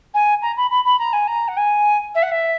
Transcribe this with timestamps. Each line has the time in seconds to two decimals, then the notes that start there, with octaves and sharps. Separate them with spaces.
0.14 G#5
0.41 A#5
0.57 B5
0.70 B5
0.85 B5
0.99 A#5
1.13 G#5
1.27 A#5
1.48 F#5
1.57 G#5
2.14 E5
2.22 F#5
2.31 E5